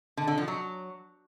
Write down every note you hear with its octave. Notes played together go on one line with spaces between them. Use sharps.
D3
D3
F3
F#3